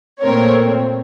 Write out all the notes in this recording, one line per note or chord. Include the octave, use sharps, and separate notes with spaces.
A#2 A3 C4 A#4 C#5